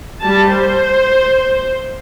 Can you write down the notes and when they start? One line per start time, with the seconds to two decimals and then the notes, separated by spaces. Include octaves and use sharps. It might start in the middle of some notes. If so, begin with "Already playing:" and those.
0.21 G3 A5
0.53 C5